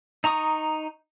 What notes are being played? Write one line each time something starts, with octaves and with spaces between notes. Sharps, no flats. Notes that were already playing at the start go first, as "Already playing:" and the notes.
D#4 A#5 C#6 D#6